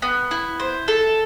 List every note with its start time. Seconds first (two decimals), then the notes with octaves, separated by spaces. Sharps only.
0.02 B3
0.31 E4
0.60 C5
0.88 A4